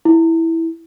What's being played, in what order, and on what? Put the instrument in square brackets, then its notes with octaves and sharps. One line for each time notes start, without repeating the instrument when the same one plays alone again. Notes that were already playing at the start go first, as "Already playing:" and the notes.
[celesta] E4